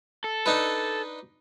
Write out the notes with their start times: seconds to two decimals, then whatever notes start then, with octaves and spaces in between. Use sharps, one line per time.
0.24 A4
0.46 D4 D#4 B4